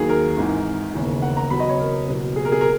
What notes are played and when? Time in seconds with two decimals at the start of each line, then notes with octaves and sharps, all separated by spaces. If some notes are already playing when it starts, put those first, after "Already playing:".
Already playing: D#2 D#3 F#3 G#4
0.09 A#4
0.37 G#1 G#2 E3
0.94 E1 D#2 C#3 E3
1.22 F#5
1.37 A#5
1.50 E1 E2 C#3 F#3 B5
1.60 D#5
1.69 C#5
1.79 A#4
2.08 F#1 E2 B2 F#3
2.36 G#4
2.45 A#4
2.52 G#4
2.61 A#4